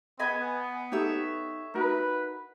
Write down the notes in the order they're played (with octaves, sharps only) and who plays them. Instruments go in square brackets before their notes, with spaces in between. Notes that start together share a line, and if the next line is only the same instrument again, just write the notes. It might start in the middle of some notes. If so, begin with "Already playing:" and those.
[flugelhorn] B3 [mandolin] D#5 G#5 B5
[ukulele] D#4 G4 A4 [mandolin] C#5 E5
[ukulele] D#4 F#4 A#4 [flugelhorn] B4